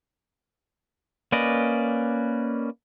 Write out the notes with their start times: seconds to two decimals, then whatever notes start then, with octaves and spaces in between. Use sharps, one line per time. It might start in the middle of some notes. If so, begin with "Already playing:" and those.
1.32 A#3 C#4 B4 D5 D#5